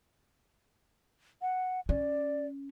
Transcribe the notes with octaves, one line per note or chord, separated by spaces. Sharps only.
F#5
C#4 D5